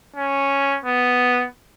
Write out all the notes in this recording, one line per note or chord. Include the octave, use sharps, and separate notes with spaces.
C#4
B3